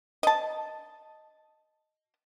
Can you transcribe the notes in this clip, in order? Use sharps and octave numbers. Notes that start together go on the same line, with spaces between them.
D#5 A5